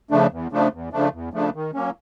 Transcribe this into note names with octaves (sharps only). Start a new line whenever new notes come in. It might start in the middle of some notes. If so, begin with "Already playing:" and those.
C#3 F3 A3 D4
E2
C#3 F3 A3 D4
E2
C#3 F3 A3 D4
E2
C#3 F3 A3 D4
D#3
F#3 A#3 C#4